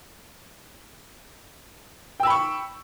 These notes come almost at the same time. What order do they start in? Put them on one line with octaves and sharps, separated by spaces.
G5 E6 B5 C#6